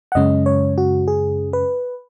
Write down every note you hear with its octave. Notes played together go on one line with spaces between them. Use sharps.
F#5
F#2 C#3 G#3 C#4 D#5
C#5
F#4
G#4
B4